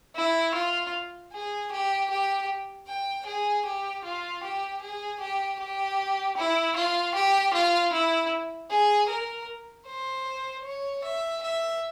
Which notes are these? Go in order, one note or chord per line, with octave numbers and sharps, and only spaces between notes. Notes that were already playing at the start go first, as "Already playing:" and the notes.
E4
F4
G#4
G4
G4
G5
G#4
G4
F4
G4
G#4
G4
G4
E4
F4
G4
F4
E4
G#4
A#4
C5
C#5
E5
E5